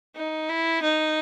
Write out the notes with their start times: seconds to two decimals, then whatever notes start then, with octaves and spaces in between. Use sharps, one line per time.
0.16 D#4
0.49 E4
0.83 D#4